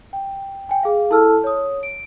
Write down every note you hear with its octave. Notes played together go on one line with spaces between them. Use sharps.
G5
G5 G#5
G#4 F5
E4 A4 A5 E6 F6
C#5 D#6
D7